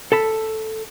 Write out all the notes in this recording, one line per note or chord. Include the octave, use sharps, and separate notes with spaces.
A4 A5 B5